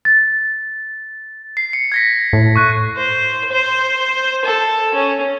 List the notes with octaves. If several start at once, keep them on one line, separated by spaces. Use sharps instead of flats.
A6
C7
C#7
G#6 A#6 B6
A2
C#6 F#6 D#7
C5
C5
A4
C#4